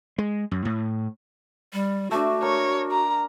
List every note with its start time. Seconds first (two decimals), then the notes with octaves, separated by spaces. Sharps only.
0.18 G#3
0.51 F#2
0.65 A2
1.73 G3
2.11 A3 D4 F#4
2.42 A#4 C#5
2.91 A#5